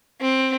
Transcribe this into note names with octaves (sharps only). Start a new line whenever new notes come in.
C4